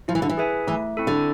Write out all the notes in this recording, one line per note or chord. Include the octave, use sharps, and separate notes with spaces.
F3 E4
E3
D3
E3
G#4 B4 E5 G#5
E3 A3
C4 E4 A4
D3